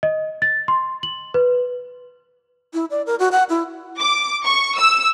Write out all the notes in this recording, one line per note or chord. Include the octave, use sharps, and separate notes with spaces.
D#5
A6
C6
F#7
B4
E4
D5
A#4
F#4
F#5
E4
D6
C#6
E6